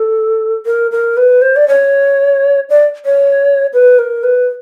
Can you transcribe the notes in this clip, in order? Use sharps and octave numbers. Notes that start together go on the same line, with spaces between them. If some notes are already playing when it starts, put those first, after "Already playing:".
Already playing: A4
A#4
A#4
B4
C5
D5
C#5
D5
C#5
B4
A#4
B4